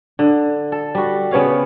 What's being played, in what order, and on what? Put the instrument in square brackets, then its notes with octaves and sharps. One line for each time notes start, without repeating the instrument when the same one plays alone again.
[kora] D3
A4
G3 F#4
C#3 B3 C#5 F5